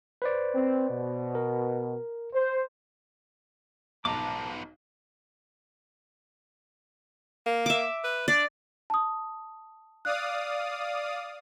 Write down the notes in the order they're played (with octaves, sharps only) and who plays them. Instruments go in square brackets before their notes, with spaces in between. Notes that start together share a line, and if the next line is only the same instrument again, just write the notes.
[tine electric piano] B4 C5 D5
[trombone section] C4
B2
[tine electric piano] A#4
[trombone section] C5
[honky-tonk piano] B1 G#2 [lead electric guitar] F3 B3 [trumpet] A5 [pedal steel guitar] A#5 D6
[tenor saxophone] A#3
[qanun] E5 D6
[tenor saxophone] B4
[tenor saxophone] D4 [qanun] D5
[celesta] A5 D#6
[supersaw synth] D5 F5 D#6 [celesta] F#6